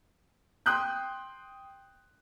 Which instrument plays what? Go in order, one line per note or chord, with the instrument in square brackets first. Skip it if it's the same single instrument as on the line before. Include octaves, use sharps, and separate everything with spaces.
[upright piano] G5 C6 D#6 F#6 G6